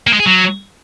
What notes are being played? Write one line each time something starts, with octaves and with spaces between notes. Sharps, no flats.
A#3
G#3
G#4
F#3